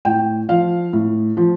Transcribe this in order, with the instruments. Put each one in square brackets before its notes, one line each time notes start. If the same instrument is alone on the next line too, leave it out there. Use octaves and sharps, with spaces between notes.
[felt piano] A2 G5
F3 F5
A2
F3